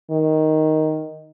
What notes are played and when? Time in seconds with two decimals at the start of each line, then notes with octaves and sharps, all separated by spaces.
0.11 D#3